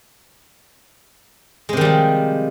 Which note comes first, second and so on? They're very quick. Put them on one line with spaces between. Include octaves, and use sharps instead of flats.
G#3 C3 D#3 G3 F3